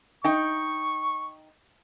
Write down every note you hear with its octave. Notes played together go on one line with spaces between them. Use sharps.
D#4 G5 C#6